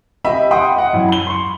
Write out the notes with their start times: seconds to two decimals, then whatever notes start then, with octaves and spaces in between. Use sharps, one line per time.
0.25 G4 D#5 E5 B5
0.51 F#5 G5 C6 D#6
0.75 D#5 F#5
0.93 F#2 E4
1.08 B5 G7
1.27 C6 C#6